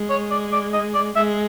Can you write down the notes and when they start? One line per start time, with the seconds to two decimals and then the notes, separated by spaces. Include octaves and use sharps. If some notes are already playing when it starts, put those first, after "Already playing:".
Already playing: G#3
0.10 C#5
0.31 D5
0.52 D5
0.73 D#5
0.94 D5
1.15 G#3 E5